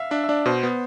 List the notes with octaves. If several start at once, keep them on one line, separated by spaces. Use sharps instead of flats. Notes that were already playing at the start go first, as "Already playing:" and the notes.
Already playing: E5 F5
D4 E5
E5
D4 D5
B2 C5
B3